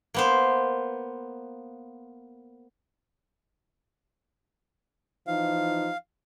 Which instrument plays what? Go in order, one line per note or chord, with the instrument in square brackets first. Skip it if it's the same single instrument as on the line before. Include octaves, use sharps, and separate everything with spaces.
[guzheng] A#3 B3 C5
[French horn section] E3 F3 D#4 [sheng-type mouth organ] F5